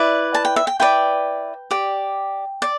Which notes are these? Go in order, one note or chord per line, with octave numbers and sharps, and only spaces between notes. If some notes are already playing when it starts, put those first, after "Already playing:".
Already playing: E4 B4 D5
A5
G5
E5
G5
E4 B4 D5 G5
G4 D5
D5